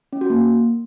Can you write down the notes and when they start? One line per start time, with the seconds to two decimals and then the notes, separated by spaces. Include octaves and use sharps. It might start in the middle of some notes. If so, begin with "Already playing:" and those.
0.13 C#4
0.21 F#4
0.30 A#3